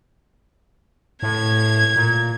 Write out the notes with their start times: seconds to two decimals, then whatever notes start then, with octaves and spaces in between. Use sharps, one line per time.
1.23 A2 G#6
1.96 A#2